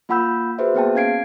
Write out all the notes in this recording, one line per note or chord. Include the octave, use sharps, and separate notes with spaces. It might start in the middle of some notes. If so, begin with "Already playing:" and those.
A#3 F4 F#5 B5 E6 G6
F#4 G#4 B4 C5 E5
A#3 B3 G#4 G5 A5
C#4 F5 G#6 C7 D7